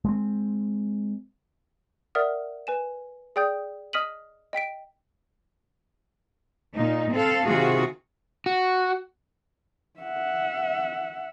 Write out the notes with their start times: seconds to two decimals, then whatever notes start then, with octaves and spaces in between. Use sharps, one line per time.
0.05 G#3 A#3 C4
2.15 A#4 D5 E5 F#5 D#6 F6
2.67 B4 G#5 E7
3.36 G#4 D5 G5 D#6 G6
3.93 D#5 D#6 F6 B6 D#7 F#7
4.53 D#5 G5 B6 D7
6.75 A#2 D#4
7.13 C4 A4 F5
7.46 C3 D#3 F4 F#4 G#4
8.46 F#4
10.00 E5 F#5